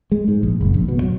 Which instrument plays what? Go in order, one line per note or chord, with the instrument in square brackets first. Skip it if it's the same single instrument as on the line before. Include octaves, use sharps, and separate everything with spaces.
[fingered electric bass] G#3
G#2
A#1
F#1
A#1
B2
F#3